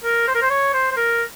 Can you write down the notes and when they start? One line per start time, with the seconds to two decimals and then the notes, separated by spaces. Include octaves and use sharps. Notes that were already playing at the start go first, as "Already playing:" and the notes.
0.04 A#4
0.28 C5
0.35 A#4
0.42 C5
0.50 C#5
0.74 C5
0.91 C5
0.96 A#4